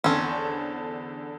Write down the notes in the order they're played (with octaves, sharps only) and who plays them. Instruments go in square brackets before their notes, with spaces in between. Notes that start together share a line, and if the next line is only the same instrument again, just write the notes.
[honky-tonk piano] E2 D3 A5 [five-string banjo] C4 C#4